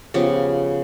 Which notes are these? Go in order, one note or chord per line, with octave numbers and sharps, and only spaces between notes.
C#3 F3 B3 G4